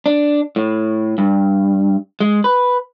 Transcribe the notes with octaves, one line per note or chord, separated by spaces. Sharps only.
D4
A2
G2
G#3
B4